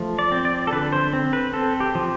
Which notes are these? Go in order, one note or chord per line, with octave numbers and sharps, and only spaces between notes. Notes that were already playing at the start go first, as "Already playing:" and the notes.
Already playing: F3 A3
D5
C4
D5
A4
D3 B4
C5
C4
B4
C4 A4
G4
F3